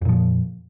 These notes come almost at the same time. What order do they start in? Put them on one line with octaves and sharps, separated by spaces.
F2 A#2 F3